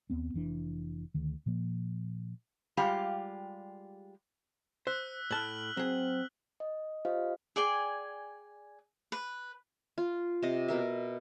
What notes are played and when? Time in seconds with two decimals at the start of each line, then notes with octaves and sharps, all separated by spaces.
0.10 D#2 G#2 B3 C4
0.34 F1 E3 D4
1.14 D2 D#3
1.46 A#2 F3 A#3
2.77 G3 G#3 F4 G4 F5
4.87 C5 E6 F#6 B6
5.31 A2 A5 F6 F#6 F#7
5.77 F#3 C4 G#4
6.60 D#5
7.05 F4 G4 C5 D#5 F5
7.56 G#4 D5 G5 G#5
9.12 B4
9.98 F4
10.43 C3 D#5
10.68 B2 A#4 E5